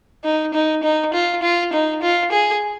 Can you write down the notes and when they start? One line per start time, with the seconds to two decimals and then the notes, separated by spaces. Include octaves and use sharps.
0.24 D#4
0.54 D#4
0.83 D#4
1.13 F4
1.42 F4
1.73 D#4
2.02 F4
2.32 G#4